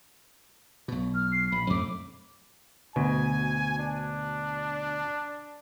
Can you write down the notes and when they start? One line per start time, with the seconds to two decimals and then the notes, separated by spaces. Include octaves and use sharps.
0.88 B1 B2
1.15 F6
1.32 C7
1.52 A#1 B5
1.70 F2 A3 D6
2.96 D2 B2 G#5
3.78 D4